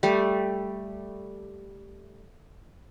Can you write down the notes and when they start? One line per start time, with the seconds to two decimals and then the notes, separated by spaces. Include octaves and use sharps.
0.03 G3 A3